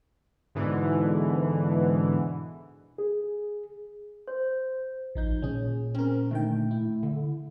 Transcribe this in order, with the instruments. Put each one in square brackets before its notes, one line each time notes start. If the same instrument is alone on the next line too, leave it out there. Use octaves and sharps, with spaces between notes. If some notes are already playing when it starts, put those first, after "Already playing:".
[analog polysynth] G#2 B2 D3 E3
[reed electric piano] G#4
[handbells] C5
[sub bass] A1 [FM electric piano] F3 D#4 G6
[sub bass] A#2 [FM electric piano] C#4 G#4
[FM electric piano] C4 A#4 [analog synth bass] C#4
[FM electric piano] D3 D#3 G5 [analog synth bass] A3
[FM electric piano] E4
[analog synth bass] D3